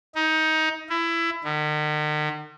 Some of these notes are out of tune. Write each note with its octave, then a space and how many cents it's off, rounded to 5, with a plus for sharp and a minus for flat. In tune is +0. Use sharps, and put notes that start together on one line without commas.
D#4 +20
E4 +20
D#3 -45